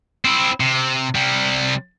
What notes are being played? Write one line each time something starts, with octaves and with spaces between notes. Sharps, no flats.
C4 E4
C3
C3 G3